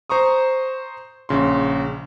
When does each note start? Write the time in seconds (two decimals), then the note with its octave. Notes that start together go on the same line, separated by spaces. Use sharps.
0.10 C5 A#5 C#6 D#6
1.29 A#1 C#3 C6